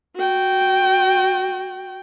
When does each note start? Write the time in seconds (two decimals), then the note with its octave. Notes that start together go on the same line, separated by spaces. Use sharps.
0.16 F#4 G5